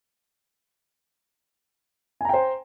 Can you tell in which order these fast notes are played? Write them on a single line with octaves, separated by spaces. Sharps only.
G#5 A#5 G5 C5